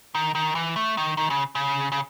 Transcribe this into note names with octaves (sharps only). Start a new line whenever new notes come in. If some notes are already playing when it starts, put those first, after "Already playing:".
D#3
D#3
E3
A3
D#3
D#3
C#3
C#3
C#3